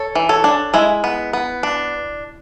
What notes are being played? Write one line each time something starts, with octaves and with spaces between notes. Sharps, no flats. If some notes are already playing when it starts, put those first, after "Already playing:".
Already playing: A4 C#5
E3
A4 C#5
D4
G#3 E4
B3
B3
D4